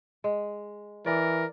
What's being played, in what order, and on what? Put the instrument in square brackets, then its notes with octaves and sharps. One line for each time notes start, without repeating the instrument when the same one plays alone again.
[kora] G#3
[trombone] E3 [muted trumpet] A#4 [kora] D5